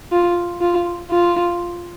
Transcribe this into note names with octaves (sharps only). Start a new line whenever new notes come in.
F4
F4
F4